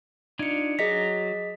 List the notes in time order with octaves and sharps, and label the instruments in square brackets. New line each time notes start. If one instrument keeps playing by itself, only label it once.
[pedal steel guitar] D4 D#4 F4 [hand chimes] G#6 C#7
[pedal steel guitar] F#3 A#5 [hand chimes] G#4 D#5 B6